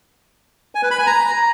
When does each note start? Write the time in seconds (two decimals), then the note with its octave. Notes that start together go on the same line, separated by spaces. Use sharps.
0.75 G#5
0.83 B4
0.91 B5
0.99 G#5
1.07 A#5